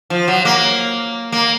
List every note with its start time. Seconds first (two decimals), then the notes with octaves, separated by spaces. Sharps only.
0.10 F3
0.28 F#3
0.45 A#3
1.32 A#3